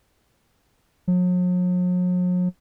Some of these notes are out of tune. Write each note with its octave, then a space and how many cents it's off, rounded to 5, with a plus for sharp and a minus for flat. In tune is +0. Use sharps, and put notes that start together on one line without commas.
F#3 -45